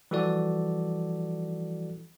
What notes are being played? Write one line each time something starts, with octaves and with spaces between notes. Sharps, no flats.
E3 F3 G3 F#4 A4 D5